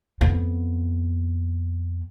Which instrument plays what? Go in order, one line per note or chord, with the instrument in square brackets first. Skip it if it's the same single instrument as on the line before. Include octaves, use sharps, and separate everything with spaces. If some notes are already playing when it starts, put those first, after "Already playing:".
[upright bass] F2 B3